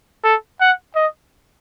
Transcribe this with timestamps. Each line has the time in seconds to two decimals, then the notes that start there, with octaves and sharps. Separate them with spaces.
0.24 A4
0.60 F#5
0.96 D#5